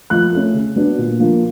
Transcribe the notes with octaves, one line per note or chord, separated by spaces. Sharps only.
F3 F#6
A3 C#4
C#3
F#3 B3 D4
A#2
F3 A#3 D4